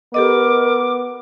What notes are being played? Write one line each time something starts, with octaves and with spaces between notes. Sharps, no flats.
B3 G4 A4 A#4 D#5 D6